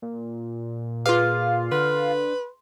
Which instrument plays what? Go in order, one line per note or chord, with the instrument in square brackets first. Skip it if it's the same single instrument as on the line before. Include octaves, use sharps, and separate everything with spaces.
[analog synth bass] A#2
[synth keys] F4 F5 [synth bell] G#4 B4 D6
[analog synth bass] D3 [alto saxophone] B4 [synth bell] C6